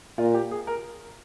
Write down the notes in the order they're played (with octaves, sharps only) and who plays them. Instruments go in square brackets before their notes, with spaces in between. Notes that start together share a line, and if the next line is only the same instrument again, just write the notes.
[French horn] A#2 [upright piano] F4
[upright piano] G4
G#4
A#4